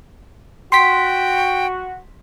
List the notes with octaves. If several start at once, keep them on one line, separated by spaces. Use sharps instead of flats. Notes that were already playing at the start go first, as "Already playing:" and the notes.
F#4 G5 C6 B6